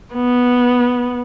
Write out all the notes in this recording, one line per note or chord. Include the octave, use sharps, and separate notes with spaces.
B3